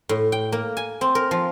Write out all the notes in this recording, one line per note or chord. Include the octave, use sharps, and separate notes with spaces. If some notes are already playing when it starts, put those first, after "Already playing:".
A2
G5
A#3
G#5
C4
A#4
F3